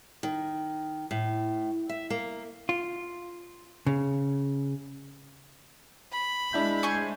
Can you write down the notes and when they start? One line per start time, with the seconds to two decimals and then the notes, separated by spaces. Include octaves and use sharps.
0.23 D#3
1.11 A2
1.89 E5
2.10 A#3
2.69 F4
3.87 C#3
6.12 B5
6.53 G#3 D4 E4 G6
6.83 C5 G#5 C#6